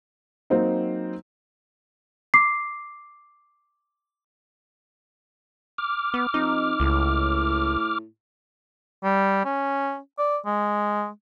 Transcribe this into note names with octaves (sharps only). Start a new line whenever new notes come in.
F#3 A#3 C4 D#4
D6 C7
D6 F6
B3
F2 D#4
C#2 A2
G3
C#4
D5
G#3